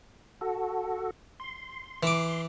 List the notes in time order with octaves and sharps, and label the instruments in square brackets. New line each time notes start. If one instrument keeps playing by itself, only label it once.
[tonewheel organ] F#4 A4
C6
[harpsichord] E3 D6